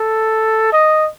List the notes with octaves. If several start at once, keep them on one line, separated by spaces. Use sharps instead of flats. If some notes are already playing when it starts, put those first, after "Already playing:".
Already playing: A4
D#5